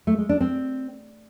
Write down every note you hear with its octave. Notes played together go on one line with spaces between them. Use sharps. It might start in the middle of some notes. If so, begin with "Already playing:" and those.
A3
G#3
D4
C4